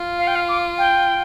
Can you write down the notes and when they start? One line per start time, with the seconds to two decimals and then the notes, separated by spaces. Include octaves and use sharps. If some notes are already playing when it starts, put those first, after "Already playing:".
Already playing: F4
0.19 F5
0.27 G5
0.36 F5
0.48 D6
0.78 G5